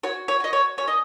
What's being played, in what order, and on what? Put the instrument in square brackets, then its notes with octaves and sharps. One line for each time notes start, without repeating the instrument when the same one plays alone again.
[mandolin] F#4 C#5
C#5
F#4 D#5
C#5
C#4 C#5
D#5